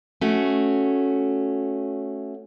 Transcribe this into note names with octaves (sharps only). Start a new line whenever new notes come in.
A3 C#4 F#4